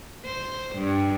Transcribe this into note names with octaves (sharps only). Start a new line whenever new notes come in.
C5
G2